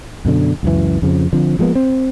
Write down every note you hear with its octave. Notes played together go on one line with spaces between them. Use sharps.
F#2 B2 D3 D4
C#2 F#2 E3
F2 C#3 F3
D3 F3 C4
F3 G#3 A#3 B3
C4